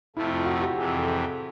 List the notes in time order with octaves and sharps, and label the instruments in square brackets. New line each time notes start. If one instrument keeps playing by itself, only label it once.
[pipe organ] F2 C3 F3 A3 [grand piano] E4
[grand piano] F4
F#4
G4
[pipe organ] F2 C3 E3 [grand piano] G#4
[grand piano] A4